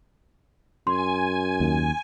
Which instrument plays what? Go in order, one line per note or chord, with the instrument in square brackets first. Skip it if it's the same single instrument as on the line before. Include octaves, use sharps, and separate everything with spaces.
[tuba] F#2 [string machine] G#5 [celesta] C6
[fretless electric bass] D#2